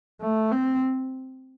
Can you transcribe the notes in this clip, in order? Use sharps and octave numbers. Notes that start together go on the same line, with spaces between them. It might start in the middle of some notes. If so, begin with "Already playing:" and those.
A3
C4